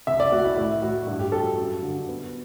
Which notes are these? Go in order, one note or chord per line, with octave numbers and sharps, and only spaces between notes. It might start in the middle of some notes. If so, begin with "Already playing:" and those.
C2 E5
D5
A3 F#4
E4
A2 E4
A2 F#4
G2 F#4
G4
F#3 A4
F#2
D3
B3